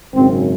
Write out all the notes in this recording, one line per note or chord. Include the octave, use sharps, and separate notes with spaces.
G#1 F#2 C#3 C4